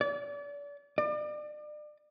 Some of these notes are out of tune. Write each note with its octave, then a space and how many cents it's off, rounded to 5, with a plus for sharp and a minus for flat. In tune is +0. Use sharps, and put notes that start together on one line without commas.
D5 -35
D5 +35